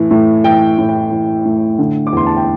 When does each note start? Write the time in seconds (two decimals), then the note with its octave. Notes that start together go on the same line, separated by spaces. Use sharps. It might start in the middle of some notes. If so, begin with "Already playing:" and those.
Already playing: A2 E3
0.11 A2
0.44 E3 G5
0.78 A2
0.89 G5
1.11 E3
1.45 A2
1.79 D3
2.07 D6
2.13 E2 C6
2.26 A5
2.37 G5